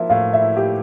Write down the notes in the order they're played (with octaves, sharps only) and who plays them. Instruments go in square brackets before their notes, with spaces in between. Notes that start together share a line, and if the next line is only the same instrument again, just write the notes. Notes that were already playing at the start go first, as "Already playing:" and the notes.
Already playing: [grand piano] F3 A#3 E4 [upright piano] E5
[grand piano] A2 [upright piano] F5
[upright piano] E5
[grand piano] E4
[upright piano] G4